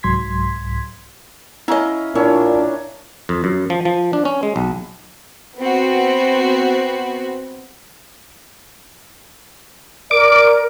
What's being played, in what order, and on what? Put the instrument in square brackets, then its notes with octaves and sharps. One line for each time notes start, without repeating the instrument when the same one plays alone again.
[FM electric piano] C2 G#2 F#3 C6 G#6 B6
[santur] C#4 F5 A#5 [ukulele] E4 D#5
[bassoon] A#2 [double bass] D4 [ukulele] E4 [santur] C#5
[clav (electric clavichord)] F2
F#2
F3
F3
D4
C#4
G#3
B1
[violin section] B3 C4 F#4
[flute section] A#4 [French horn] D5 [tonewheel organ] D6